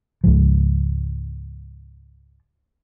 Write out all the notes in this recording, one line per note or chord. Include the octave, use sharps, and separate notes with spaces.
C#2 G#2 F3